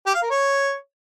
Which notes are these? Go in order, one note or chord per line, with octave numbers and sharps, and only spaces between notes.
G4
F5
A#4
C#5